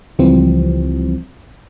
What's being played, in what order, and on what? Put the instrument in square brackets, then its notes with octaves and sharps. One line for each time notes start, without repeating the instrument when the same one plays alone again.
[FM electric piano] C#2 E3 F3 G3 C4